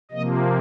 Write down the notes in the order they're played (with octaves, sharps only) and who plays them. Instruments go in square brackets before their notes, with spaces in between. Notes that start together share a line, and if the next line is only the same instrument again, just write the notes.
[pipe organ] C3 F3 A#3 D#5